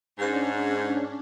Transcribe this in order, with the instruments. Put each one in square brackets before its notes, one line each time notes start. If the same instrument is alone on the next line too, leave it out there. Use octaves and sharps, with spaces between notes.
[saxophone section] G#2 [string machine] C#4 D4